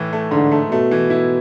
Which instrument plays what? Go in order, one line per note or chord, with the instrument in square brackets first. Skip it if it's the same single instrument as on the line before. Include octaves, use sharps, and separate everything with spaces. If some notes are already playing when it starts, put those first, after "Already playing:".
Already playing: [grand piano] A2 E3
A3
[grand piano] G#2 [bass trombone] D3
[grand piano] A3
[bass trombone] B2 [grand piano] A3
[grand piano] E3
E4